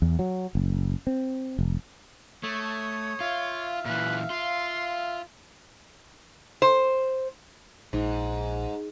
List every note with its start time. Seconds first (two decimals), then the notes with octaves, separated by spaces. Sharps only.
0.02 E2
0.19 F#3
0.55 F#1
1.07 C4
1.59 F1
2.43 A3 C#5 D#6
3.21 F4 E5 F5
3.86 A#2 E3 B4
4.30 F4 C6
6.62 C5
7.93 A#1 G#2